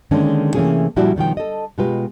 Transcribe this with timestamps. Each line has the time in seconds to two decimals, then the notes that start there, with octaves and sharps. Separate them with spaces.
0.11 D3 D#3 G#3 A#3 C#4 D4
0.55 C3 E3 A3 A#3 C#4 G#4
0.96 A#2 F3 G3 D4 E4 F#4
1.16 B2 D#3 F3 G5
1.37 A4 D#5
1.78 B2 G#3 F4 G4 B4